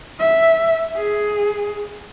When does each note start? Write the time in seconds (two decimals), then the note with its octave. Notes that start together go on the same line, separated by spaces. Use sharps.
0.19 E5
0.96 G#4